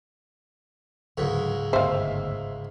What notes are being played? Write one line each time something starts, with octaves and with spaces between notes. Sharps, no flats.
D1 C#2 G#2 D3 F#3
G1 D2 D#3 B3 C5 E5 F5